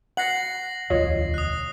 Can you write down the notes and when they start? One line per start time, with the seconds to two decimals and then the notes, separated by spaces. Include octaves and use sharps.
0.17 F#5 A#6 C7 F#7
0.90 E1 D2 F4 C#5 D#5
1.34 D#6 F#6